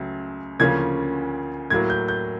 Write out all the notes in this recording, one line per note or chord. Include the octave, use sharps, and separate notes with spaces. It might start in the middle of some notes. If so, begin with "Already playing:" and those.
Already playing: C#2 C#3 F#3 A3
D2 C#3 F3 A#3 C#4 G#6
A2 F#3 A#3 G#6
G6
G6